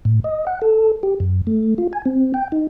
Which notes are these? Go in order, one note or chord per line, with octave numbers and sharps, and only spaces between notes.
A2
D#5
F#5
A4
G4
F#2
A3
F4
G#5
C4
G5
D#4